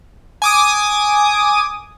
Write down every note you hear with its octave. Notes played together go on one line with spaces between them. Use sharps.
G#5 D6 D#6